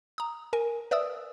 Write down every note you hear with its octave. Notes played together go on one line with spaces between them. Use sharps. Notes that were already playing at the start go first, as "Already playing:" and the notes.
A#5 D#6
A#4 G#5
B4 D5 E5 D#6 E6